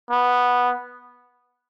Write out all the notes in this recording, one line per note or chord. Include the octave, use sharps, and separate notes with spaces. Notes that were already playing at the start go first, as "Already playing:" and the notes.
B3